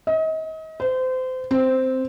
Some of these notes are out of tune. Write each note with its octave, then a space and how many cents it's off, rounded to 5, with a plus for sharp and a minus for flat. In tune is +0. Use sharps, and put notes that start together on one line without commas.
D#5 +35
C5 -30
C4 -5